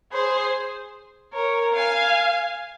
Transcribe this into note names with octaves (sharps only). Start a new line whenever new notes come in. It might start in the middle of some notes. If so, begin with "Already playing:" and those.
G#4 C5
A#4 C#5
F5 G#5